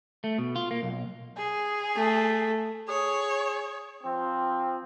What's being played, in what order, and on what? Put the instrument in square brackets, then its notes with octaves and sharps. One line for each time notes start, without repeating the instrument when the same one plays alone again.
[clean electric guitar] A3
B2
F4
A#3
B1
[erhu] G#4
[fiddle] A3
[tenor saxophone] G#4 [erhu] C#5
[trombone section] F3 C4